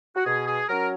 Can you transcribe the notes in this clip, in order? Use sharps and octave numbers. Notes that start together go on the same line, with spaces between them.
F#4
B2 G#4
G#4
F#3 C#4 A#4